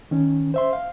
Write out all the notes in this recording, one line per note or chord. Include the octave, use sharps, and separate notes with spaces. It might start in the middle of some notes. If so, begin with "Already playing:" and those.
D#3 C#4
C5 E5 C6
F5